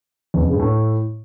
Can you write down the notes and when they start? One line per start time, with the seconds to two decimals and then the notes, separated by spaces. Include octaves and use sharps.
0.34 E2
0.40 F2
0.47 C#3
0.53 G2
0.59 A2